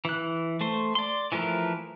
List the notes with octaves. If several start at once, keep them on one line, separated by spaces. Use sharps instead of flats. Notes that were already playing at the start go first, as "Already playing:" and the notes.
E3 F#6
A3 C5 C6
D5 C6
E3 F3 A3 A#4 B4